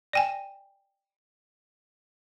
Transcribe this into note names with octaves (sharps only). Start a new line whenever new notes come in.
D5 G5 G#5